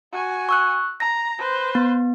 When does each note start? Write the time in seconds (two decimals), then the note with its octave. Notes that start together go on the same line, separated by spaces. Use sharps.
0.12 F#4 G#5
0.49 C#6 E6 F#6
1.00 A#5 A#6
1.38 B4 C5
1.75 B3